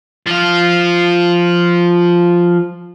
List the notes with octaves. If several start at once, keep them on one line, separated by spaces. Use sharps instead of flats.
F3 F4